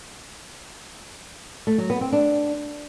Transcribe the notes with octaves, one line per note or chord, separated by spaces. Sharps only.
A3
F#3
B3
C4
D4